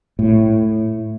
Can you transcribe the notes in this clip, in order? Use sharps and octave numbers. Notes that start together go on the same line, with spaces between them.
A2